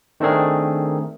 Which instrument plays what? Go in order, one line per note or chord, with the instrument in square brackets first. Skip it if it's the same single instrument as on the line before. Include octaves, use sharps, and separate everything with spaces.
[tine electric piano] D#3 A3 C4 D4 G#4 A#4